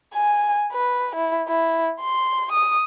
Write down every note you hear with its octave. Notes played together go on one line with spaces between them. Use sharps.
G#5
B4
E4
E4
C6
D#6